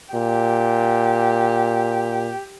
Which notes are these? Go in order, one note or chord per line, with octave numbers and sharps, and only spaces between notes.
A#2 G4